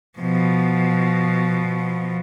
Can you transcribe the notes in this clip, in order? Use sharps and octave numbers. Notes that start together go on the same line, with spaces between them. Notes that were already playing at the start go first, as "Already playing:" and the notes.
B2 F3